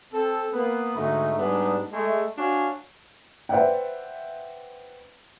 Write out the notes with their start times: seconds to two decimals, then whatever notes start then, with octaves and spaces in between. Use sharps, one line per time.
0.13 C4 A4
0.53 A#3 B3
0.96 G#2 D3 A3 D#4 F#4
1.39 G#2 G3 B3 D4 D#4
1.93 G#3 A3
2.38 D4 F#4 C#5 F5 G#5
3.49 B4 C5 D5 E5 F#5 G5